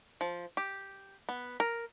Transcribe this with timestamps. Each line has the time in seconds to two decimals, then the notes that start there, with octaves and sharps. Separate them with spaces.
0.21 F3
0.57 G4
1.29 B3
1.60 A#4